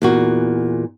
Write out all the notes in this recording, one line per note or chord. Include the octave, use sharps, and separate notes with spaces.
E2 A#2 F#4